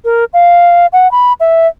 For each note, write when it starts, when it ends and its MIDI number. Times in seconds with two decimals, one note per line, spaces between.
0.05 0.24 70
0.33 0.86 77
0.93 1.10 78
1.11 1.33 83
1.40 1.67 76